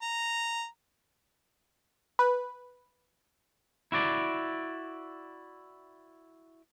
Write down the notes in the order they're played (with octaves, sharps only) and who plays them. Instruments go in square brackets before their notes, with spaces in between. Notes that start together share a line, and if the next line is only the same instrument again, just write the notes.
[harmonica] A#5
[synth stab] B4
[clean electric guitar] E4 F#4 D5